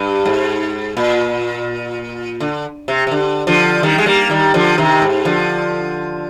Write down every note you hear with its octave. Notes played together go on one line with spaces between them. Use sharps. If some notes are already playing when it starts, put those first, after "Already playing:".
Already playing: G2
G#2
A#2
D3
C3
C3
D3
D3 F3
D#3 G3
G#3
G3 A#3
D#3 G3
D3 F3
C3 D#3
G#2
D3 F3